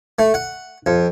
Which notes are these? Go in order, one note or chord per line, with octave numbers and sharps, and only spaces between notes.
A3
F#5
F2